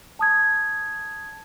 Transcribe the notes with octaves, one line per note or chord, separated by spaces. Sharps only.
A5 D#6 G#6